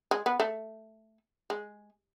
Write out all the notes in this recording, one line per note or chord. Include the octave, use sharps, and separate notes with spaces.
G#3
B3
A3
G#3